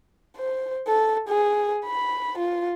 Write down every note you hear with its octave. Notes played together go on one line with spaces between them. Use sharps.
C5
A4
G#4
B5
F4